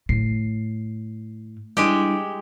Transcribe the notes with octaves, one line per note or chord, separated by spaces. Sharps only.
A2 C7
G3 G#3 D4 E4 G4